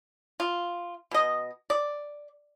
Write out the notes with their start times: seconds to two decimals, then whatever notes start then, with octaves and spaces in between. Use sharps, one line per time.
0.40 F4
1.11 B2 D#5
1.70 D5